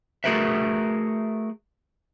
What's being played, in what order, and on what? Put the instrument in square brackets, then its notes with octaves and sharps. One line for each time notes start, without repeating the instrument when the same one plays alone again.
[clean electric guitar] A3 F#4 G#4 A#4 B4 E5